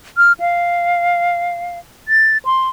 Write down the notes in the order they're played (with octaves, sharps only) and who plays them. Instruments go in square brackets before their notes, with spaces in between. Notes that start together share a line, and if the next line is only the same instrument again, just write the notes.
[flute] F6
F5
A6
C6